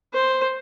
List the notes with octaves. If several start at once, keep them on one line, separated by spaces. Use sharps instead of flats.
C5